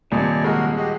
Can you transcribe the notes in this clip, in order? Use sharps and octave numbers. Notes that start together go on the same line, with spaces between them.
D#1 D#2 C3 D5 D#5 G#5
G#3 F#4 A#4
F#4 G4 D#5